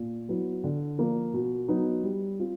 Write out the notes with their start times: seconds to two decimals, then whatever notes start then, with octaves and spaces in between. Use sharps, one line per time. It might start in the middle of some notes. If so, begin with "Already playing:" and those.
Already playing: A#2
0.29 F#3 B3 E4
0.64 D3
0.98 F3 A#3
1.34 B2
1.68 F#3 B3 D#4
2.04 G3
2.39 C4 F4